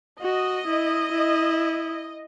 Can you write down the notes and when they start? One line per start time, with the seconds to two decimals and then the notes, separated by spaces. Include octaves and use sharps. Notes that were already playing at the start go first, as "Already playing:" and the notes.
0.21 F#4 D#5
0.67 E4
1.12 E4